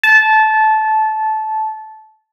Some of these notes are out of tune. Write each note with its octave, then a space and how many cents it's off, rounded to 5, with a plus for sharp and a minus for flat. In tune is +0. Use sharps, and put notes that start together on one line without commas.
A5 -15